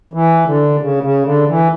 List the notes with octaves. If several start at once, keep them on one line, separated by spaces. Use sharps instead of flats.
E3
D3
C#3
C#3
D3
E3